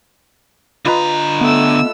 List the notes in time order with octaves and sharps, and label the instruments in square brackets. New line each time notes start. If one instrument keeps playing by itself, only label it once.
[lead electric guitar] D3 A#5 [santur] F4 B4 D#5
[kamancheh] A3 E6 [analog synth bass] B3